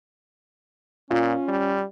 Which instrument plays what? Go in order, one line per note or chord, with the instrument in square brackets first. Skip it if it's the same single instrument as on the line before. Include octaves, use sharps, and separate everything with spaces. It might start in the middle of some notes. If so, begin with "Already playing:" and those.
[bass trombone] A#2 [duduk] C#4 [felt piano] F4
[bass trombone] G3